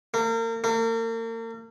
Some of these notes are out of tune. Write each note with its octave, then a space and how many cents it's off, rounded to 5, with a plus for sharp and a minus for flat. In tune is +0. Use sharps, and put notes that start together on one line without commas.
A#3 -35
A#3 -40